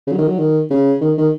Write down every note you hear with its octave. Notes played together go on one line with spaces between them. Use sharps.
C#3
F#3
D#3
F#3
D#3
C#3
D#3
D#3